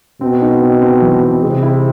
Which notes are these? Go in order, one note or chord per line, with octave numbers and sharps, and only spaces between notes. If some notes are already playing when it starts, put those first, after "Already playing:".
B2 C4
D#4
C4
C4
E3
C4
C3 G#3
E4